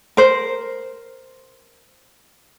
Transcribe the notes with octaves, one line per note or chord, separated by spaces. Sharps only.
A#4 C5